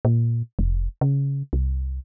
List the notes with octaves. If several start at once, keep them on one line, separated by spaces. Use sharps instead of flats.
A#2
F1
C#3
C2